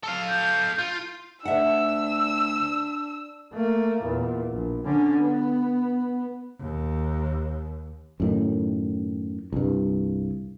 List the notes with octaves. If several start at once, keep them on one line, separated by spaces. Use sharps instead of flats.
A4 F5
G6
F4
D2 D4 E5 F#5 E6
A3 A#3
E2 A#2
A#1
D3 C#4
B3
D#2
F#2 A2 D#3
C2 G2